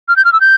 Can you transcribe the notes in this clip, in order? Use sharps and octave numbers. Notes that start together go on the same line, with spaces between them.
F6
G6
F6
E6
G6